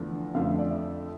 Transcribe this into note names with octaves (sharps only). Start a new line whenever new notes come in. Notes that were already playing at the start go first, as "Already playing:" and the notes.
Already playing: E2 D3 F3 A3
F2 D3 F3 A3 F5
E5
D5
E5